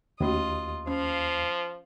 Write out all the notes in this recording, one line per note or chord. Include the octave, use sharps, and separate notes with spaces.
D#2 A3 C#4 F4 F#4 D#5
F3 C#4 F5